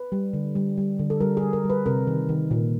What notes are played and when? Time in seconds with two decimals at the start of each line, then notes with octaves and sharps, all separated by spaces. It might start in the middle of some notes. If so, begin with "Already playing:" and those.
Already playing: B4
0.12 G3
0.33 D3
0.55 G3
0.77 G3
0.99 D3
1.10 A4
1.20 G3 A#4
1.37 G#4
1.42 G3
1.53 A#4
1.64 G3
1.70 B4
1.86 C3 A#4
2.07 D#3
2.29 D#3
2.51 A#2